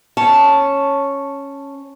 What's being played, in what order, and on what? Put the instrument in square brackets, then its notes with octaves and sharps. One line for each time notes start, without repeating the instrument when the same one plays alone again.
[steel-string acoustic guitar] C#4 C#5 A5